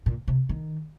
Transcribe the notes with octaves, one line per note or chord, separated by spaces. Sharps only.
A#2
C3
D#3